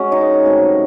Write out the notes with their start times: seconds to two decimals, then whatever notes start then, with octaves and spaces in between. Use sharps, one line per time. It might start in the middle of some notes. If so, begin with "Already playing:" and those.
Already playing: G#3 C#4 F#4 G#4 C#5
0.12 D#4
0.45 C3 D#3 F#3 A3